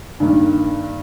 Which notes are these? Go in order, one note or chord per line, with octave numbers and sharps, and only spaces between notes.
G2 D#3 A#3